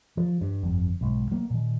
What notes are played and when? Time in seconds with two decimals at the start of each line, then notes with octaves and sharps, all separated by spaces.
0.17 F3
0.41 G2
0.63 G1 F2
1.01 B1 G#2
1.31 F#3 A#3 B3
1.50 A#2 D#3